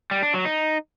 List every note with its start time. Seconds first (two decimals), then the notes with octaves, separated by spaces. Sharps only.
0.11 G3
0.22 D4
0.34 F#3
0.45 D#4